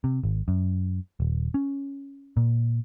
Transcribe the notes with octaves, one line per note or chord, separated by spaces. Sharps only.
C3
G#1
F#2
D#1
C#4
A#2